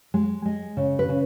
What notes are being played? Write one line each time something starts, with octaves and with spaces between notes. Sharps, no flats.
G#3
G#3
C#3
B4
C#3